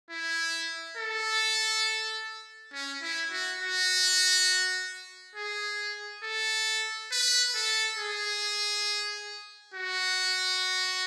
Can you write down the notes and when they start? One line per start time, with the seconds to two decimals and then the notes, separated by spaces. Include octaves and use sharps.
0.10 E4
0.97 A4
2.72 C#4
3.02 E4
3.31 F#4
3.60 F#4
5.36 G#4
6.23 A4
7.11 B4
7.55 A4
7.98 G#4
9.74 F#4